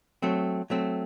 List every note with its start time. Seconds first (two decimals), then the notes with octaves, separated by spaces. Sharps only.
0.22 F#3 A3 C4
0.70 F#3 A3 C4